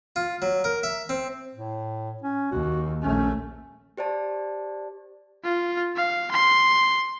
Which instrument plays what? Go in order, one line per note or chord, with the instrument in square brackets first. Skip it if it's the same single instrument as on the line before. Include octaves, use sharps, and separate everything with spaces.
[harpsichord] F4
F#3
A#4
E5
C4
[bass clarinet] A2
C#4
[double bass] D#2 [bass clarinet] F#4
[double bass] A#1 A3 [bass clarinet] C#4
[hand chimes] G4 C5 D5 A5
[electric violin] F4
F5
C6